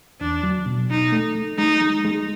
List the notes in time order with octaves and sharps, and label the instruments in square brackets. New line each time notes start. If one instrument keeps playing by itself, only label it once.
[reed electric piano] E2 [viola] D4
[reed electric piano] F#3
B2
[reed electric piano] B2 [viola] D#4
[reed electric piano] A3
A3
[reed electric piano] G#3 [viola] D#4
[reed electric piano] G#3
G#3